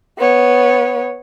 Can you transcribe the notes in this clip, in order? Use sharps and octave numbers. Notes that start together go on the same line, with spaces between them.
B3 C#5